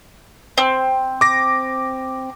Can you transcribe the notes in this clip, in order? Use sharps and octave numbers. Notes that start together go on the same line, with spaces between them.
C4
D6 A#6